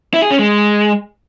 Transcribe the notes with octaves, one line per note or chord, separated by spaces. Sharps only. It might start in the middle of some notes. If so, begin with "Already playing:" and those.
E4
G#4
C#4
G#3